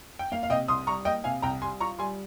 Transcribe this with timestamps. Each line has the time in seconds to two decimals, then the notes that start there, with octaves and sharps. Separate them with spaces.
0.19 G5
0.32 A#3 F5
0.43 F5
0.49 C3 D#5 G5
0.68 C2 C6 D#6
0.87 G3 A#5 C#6
1.05 A#3 D#5 G5
1.24 C3 F5 G#5
1.42 C2 G5 A#5
1.62 G3 G#5 C6
1.80 F4 A#5 C#6
1.99 G3 G#5 C6